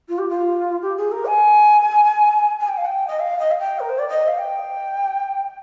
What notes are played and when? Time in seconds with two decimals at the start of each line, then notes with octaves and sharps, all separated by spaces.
0.08 F4
0.18 G4
0.29 F4
0.82 G4
0.97 G#4
1.11 A#4
1.27 G#5
2.60 G#5
2.68 G5
2.77 F5
2.85 G5
3.07 D#5
3.19 F5
3.39 D#5
3.51 F5
3.59 G5
3.79 A#4
3.89 C5
3.98 D5
4.08 D#5
4.27 F5
4.38 G5